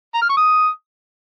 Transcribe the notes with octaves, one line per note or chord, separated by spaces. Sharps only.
A#5
F6
C#6
D#6